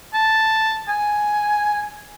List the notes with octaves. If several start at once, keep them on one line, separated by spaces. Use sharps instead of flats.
A5
G#5